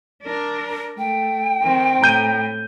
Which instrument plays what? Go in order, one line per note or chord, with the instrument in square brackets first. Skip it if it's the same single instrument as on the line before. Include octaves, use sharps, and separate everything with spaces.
[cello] D4 A#4
[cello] A3 [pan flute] G5
[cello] D#3 C4
[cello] A2 [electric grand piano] A#5 G6 D#7